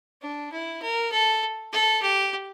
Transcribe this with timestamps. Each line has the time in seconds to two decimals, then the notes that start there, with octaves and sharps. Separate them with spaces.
0.22 D4
0.52 E4
0.82 A#4
1.12 A4
1.72 A4
2.02 G4